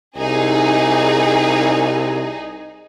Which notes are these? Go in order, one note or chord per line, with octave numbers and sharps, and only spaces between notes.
C2 D#4 G#4